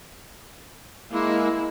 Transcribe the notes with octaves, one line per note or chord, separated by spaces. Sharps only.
G#3 A#3 E4